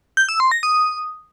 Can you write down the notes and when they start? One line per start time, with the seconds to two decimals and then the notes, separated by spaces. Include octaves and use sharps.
0.17 G6
0.29 E6
0.40 C6
0.52 A#6
0.63 D#6